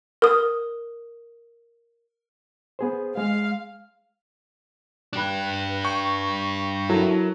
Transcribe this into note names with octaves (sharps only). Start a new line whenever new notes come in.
A#4 D#6
B3 G#4 C5
G#3 F5
D4 G4 B4 F#6
G5 C#6
F#3 E4 A4 A#4